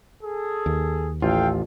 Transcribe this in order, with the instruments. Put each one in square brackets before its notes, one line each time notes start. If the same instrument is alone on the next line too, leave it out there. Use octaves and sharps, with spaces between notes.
[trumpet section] G#4 A4
[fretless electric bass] D#2
[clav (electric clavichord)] A1 F4 [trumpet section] A4 F5 G5